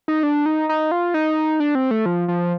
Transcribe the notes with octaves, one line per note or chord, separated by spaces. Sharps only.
D#4
D4
D#4
D#4
F4
D#4
D4
C4
A3
F3
F3